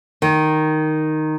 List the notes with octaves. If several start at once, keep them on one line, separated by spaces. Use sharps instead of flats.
D#3